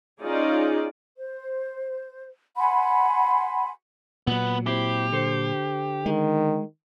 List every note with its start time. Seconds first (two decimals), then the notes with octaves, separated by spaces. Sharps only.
0.21 C#4 D#4 F4 G#4 D5
1.17 C5
2.56 F#5 G#5 B5 C6
4.27 A#2 F#3 B3
4.66 C4 E4 G4
5.12 D3 A4 C5
6.06 D#3 G#3